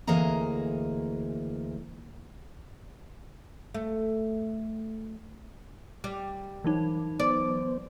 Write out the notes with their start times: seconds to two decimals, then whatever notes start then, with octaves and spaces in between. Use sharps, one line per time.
0.07 D2 E3 A#3 G#4 D#5 A#5
3.74 A3
6.04 G3
6.64 E3 F#3 D#4
7.20 B3 C5 D5